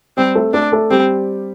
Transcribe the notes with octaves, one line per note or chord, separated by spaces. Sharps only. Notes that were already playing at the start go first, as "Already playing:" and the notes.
G3 C4 G4
A3 A4
A3 D4 A4
A3 A4
G3 C4 G4